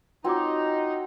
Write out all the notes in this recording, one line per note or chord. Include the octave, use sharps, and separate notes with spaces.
C4 D#4 F4 F#4 C#5 D6